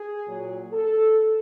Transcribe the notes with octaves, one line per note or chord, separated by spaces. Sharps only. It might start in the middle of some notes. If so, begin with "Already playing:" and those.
Already playing: G#4
A#2 F#3
A4